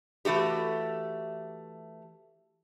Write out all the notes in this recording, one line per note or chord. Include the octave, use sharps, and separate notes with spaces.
E3 A3 F#4 G4